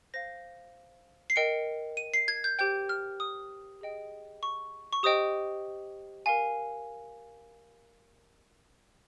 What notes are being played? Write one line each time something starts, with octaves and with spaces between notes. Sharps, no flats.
C5 F5 A#6
C7
A#4 D#5 G5 C#7
D#7
C7
G#6
G6
G4 C5 G5 G6
F6
D#6
G#4 D#5 G5
C#6
C#6
G4 C5 D#5 G5 D#6
A#4 F5 G#5